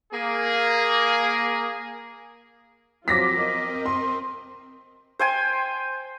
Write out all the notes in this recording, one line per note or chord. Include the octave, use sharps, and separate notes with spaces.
A#3 G#4
F3 F#3 C4 F4 D6 A#6 B6
A#4 D#5
C6
C5 G5 G#5